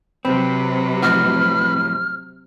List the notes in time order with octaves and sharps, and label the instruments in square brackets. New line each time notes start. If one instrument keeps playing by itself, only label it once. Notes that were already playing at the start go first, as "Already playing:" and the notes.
[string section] C3 F#3 [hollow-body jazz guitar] C4 [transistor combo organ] B4
[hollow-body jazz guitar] F2 A2 F#4 [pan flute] F6